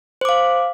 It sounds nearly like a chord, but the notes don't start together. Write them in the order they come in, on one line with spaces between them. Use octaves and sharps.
C5 D6 F5